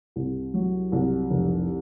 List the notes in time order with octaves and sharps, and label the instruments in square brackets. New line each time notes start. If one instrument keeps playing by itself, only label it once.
[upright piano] C2
F#3
C2
F1